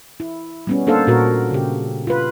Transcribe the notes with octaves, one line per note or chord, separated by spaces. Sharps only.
E4
G3 B3 C#4
A#3 D4 A4 C5 F5
A#2 F#4 A#4
C#3 G4
F4 B4